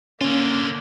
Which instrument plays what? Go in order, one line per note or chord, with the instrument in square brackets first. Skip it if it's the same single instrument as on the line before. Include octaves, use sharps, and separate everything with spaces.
[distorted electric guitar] D3 F4 [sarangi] A#3 [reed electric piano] C#4